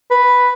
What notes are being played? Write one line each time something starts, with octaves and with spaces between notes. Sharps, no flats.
B4